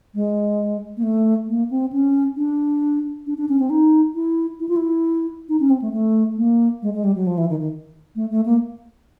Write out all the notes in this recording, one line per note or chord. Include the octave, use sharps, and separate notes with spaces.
G#3
A#3
A3
A#3
C4
C#4
D4
D4
D4
C#4
C4
D#4
E4
E4
F4
E4
D#4
C#4
C4
A3
A3
A#3
G#3
G#3
G3
F#3
F3
E3
D#3
D#3
A3
A3
A#3